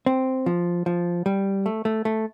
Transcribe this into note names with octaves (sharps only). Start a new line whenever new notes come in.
C4
F3
F3
G3
A3
A3
A3